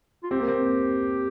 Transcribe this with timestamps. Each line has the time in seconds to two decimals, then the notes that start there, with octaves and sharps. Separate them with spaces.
0.24 F4
0.31 C4 G4
0.40 A#3
0.48 C4